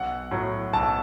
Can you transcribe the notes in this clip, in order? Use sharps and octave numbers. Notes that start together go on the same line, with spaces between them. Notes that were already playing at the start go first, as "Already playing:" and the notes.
Already playing: B1 F#5
A2 F#3
B1 A5